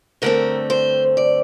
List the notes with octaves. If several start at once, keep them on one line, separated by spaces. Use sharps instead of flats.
G2 D3 A3 C4 A#4
C5
D5